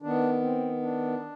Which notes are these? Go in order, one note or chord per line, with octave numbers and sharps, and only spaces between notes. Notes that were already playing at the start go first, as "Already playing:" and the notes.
D#3 B3 D4
C4
D4